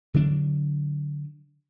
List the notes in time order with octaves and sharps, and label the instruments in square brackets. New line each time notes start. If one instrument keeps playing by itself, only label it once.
[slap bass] D3 F#3 D4